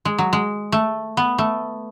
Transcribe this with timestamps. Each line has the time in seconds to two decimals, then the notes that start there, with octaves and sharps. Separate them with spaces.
0.05 G#3
0.18 F#3
0.33 G#3
0.72 A3
1.17 B3
1.38 A3